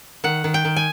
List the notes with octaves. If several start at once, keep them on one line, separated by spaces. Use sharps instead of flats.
D#3 F#5
D#3
G5
D#3
G#5